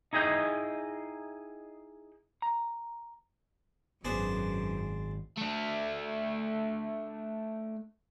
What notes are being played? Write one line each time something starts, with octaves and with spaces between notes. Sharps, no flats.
D#4 E4 G#4 D#5 G5
A#5
G#1 F#2 B3 D4 G#4 C5
A3 D4